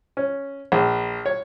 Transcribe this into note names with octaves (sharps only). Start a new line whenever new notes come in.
C#4
A#1
C#5